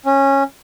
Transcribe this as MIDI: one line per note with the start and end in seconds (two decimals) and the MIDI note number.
0.06 0.43 61